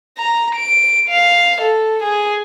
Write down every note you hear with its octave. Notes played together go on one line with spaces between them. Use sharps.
A#5
D7
F5
A4
G#4